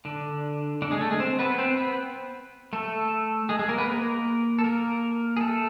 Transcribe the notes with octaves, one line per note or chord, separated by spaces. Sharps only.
D3 D4
D3 D4
G#3 G#4
A3 A4
G#3 G#4
C4 C5
B3 B4
C4 C5
B3 B4
A3 A4
G#3 G#4
G#3 G#4
A#3 A#4
B3 B4
A#3 A#4
A4
A#3 A#4
G#4
A3 A4